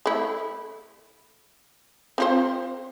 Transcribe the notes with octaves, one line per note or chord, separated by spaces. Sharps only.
A3 E4
C4 F4 C5